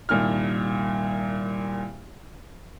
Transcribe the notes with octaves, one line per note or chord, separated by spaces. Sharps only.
C2 A#2 D#3 F6